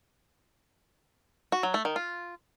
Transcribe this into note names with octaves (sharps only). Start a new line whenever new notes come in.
F#4
F#3
A3
D#3
F4